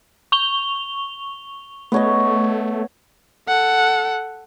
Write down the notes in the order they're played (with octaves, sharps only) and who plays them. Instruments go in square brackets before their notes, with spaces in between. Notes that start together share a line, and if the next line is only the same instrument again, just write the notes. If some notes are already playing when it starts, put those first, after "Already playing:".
[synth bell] C#6 F7 G7
[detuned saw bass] A3 [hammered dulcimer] B3 C#5 D#5
[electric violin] A4 F#5